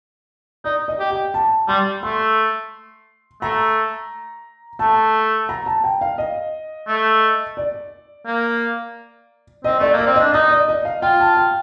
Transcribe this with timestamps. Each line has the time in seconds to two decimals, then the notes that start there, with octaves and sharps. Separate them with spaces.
0.65 D#4 D5
0.88 D#5
1.00 G4
1.10 G5
1.34 A5
1.68 G3 C6
2.03 A3 C6
3.42 A3 A#5
4.79 A3 A5
5.49 A#5
5.66 A5
5.84 G5
6.01 F5
6.18 D#5
6.88 A3
7.57 D5
8.26 A#3
9.64 C4 D#5
9.79 A3 D5
9.93 A#3
9.99 D5
10.06 C4
10.16 D4 D#5
10.33 D#4 D#5
10.51 D5
10.69 D#5
10.85 F5
11.02 F4 G5
11.20 A5
11.37 G5